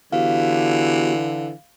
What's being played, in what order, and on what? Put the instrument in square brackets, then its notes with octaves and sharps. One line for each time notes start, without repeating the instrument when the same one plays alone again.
[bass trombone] D3 [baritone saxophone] E3 [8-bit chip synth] B3 F#4 G4 [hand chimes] F5